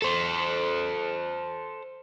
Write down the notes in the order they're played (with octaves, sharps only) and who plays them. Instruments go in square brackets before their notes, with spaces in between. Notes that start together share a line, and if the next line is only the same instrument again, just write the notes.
[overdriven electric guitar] A4 C5